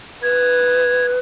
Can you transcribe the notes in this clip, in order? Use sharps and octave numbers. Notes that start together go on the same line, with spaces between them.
B4 G#6